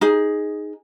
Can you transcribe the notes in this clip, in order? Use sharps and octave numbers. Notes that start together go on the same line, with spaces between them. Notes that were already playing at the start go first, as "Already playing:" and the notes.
D#4 G#4